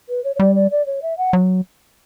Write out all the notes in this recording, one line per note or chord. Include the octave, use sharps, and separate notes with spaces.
B4
C#5
C#5
G3 D5
D5
D5
C#5
E5
F#5
F#3